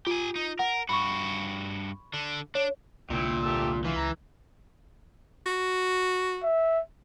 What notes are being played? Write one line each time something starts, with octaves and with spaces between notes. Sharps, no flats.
F4 G4 G#5
D#4
A#4 F#5
G2 F#4 B5 C#6
D3 D4
D4 C#5
C2 A#2 D3 E4 G5
A3 G4 E6
E3 F4
C#2 A#5
F#4
E5